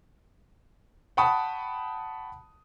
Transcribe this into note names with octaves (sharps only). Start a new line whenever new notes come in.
F#5 G5 A5 B5 C#6 D#6